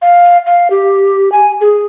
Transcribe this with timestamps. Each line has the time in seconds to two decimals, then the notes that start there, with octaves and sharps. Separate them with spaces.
0.02 F5
0.46 F5
0.70 G4
1.32 G#5
1.61 G#4